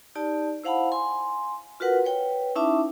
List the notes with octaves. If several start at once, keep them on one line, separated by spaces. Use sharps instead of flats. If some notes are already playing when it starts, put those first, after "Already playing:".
D#4 G4 D5 A5
E4 C5 F5 F#5 A5 B5
G#5 C6
F4 F#4 A#4 B4 F#5
B4 C#5 G5
C#4 D#4 E4 E5 A5 D6